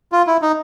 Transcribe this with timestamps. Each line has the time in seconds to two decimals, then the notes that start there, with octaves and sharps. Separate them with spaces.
0.12 F4
0.27 E4
0.42 D#4